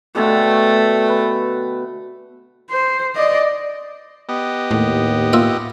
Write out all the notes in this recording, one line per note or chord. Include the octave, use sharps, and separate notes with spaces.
B2 D3 A3 G4
B4
C5
D5 D#5
B3 G4 D#5
D#2 A2
A#3 F4 E5